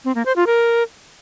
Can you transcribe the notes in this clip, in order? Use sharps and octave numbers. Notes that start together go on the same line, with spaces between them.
C4
A#3
C5
F4
A#4